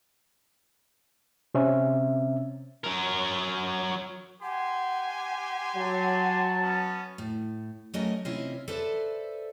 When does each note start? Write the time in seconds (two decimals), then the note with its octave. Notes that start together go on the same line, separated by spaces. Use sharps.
1.54 C3 C4 C#4 E5
2.84 F#3 A#4
4.43 G4 F#5 G#5 C6
5.76 F#3 A5
6.62 B3 C#4
7.18 A2
7.93 F#3 A3 C#4 A#4 D#5
8.25 C3 C4 C#4 E4 F4 D#5
8.68 A4 B4 C5 D5 E5